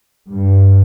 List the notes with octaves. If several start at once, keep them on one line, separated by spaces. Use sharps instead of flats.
G2